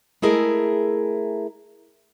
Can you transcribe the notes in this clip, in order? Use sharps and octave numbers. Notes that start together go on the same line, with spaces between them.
G#3 A3 E4 G#4 A#4